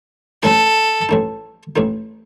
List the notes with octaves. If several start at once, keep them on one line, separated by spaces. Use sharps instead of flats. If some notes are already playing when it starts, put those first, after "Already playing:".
A1 A2 A3 D#4 A4
A1 A2 A3 D#4
A1 A2 A3 D#4